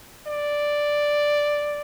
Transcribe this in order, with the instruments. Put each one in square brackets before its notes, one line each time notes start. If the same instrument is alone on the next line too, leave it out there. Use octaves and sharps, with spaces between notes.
[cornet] D5